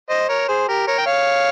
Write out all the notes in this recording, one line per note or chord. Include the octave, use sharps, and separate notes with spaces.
C5 D#5
A#4 C#5
G#4 C5
G4 A#4
A#4 C#5
G5
C#5 F5